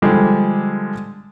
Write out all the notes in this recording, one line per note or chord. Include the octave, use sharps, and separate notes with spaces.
D3 F3 G3 G#3